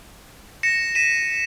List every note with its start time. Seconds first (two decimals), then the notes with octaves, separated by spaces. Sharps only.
0.63 A#6 C#7 E7
0.95 B6 D#7 E7